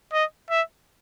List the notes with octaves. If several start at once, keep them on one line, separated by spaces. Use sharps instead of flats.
D#5
E5